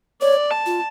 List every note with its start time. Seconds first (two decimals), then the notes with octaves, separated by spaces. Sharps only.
0.21 C#5 D5
0.51 A5
0.66 F4